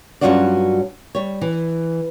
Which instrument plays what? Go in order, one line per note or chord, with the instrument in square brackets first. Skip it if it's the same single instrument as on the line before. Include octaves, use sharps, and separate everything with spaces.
[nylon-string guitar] G2 F#3 C#4 F4 F#4 D5
G3 C#5
E3